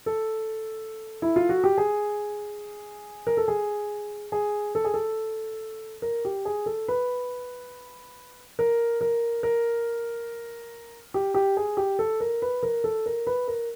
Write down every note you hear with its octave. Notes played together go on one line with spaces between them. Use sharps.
A4
E4
F4
F#4
G4
G#4
A#4
A4
G#4
G#4
A4
G#4
A4
A#4
G4
G#4
A4
B4
A#4
A#4
A#4
G4
G4
G#4
G4
A4
A#4
B4
A#4
A4
A#4
B4
A#4